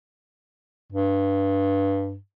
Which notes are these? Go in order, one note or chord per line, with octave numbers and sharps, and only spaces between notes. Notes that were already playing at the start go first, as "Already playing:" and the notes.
G2